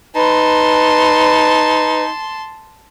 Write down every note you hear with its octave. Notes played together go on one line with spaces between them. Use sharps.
D#4 B4 A5 C6